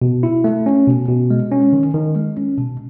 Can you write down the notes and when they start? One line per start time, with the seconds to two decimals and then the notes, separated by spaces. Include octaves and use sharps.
0.02 B2
0.23 E4
0.44 A3
0.66 C#4
0.87 B2
1.08 B2
1.30 G#3
1.52 C#4
1.73 D#3
1.94 D#3
2.16 G#3
2.37 C#4
2.58 B2